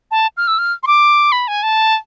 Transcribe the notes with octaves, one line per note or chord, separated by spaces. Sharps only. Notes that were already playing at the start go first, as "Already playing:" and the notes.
A5
F6
E6
F6
C6
D6
B5
G#5
A5